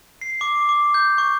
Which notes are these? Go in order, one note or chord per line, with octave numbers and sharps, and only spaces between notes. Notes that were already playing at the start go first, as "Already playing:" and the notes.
C7
D6
D6
G6
C#6